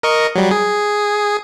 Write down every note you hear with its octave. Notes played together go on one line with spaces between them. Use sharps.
A#4 D#5 C#6
F#3 G3
G#4